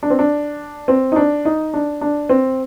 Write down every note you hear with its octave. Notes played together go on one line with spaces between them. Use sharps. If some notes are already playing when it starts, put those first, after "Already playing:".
D4
C4
D4
C4
D#4
D4
D#4
D4
D4
C4